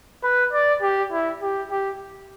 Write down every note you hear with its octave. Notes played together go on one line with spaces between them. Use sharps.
B4
D5
G4
E4
G4
G4